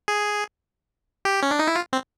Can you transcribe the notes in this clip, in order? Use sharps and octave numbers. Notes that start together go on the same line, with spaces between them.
G#4
G4
C#4
D4
D#4
E4
F4
C4